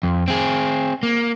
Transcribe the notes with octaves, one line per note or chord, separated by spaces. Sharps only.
F2
C4 G#4
A#3